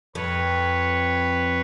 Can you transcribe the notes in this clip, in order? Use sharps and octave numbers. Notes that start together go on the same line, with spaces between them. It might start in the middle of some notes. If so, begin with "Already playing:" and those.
F2 B4 C#5